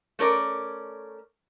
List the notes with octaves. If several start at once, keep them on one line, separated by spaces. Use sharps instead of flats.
A3 C#4 A#4 D5